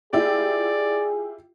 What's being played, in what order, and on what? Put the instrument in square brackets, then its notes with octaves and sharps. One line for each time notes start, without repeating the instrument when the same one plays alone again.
[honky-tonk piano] E4 F4 G4 [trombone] G#4 [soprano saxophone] D5